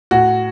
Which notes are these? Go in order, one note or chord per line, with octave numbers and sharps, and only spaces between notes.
A2 F#4